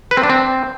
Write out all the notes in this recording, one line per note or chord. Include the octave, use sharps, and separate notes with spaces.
B4
C4
D4
C4